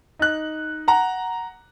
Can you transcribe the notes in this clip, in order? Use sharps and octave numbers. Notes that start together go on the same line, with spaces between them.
D#4 F#6
F#5 A#5